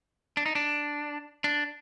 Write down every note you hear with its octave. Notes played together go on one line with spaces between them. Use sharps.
D4
D#4
D4
D4